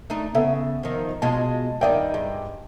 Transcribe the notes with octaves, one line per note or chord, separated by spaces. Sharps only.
A3 D4 D#4
C#3 B3 A4 E5
D#3 F3
B2 G#3 F4 A5
G2 D#3 D#4 D5 E5 G5
G2 G#3